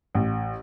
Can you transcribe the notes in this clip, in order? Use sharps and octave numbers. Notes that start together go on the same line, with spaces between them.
A1